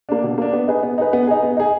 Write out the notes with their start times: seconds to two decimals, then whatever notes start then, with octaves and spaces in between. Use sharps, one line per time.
0.09 A#3 D4
0.23 B2
0.38 A#3 D4
0.53 B3
0.68 D#4 G#4 B4
0.83 B3
0.98 D#4 G#4 B4
1.13 B3
1.27 D#4 G#4
1.43 B3
1.57 D#4 G#4